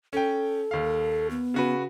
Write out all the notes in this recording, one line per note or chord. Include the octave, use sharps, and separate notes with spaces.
C#4 A4 G5
D#2 F5
B3
C#3 F#4 B4